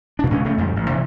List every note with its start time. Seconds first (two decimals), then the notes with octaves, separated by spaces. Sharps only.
0.19 A#2 D4
0.30 C#2 G#3 C#4
0.45 C#3 A3 C4
0.58 F2 G#2 G3
0.76 A1
0.89 C3 E3